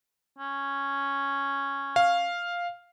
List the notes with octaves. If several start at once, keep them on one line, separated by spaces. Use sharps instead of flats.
C#4
F5